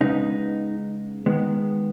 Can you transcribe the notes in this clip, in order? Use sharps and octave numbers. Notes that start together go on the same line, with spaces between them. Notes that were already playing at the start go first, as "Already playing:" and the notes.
C#3 G#3 B3 D#4
D#3 G#3 B3